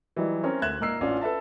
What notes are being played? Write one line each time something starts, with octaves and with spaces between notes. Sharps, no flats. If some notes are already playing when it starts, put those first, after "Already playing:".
E3 F#3 G3 D#4
C4 C#4 A#4 C5 C#5
D2 E5 F#6 G#6 E7
A#2 D#4 A#4 E6 C7
A1 C#4 D4 F4
A4 B4 E5 A5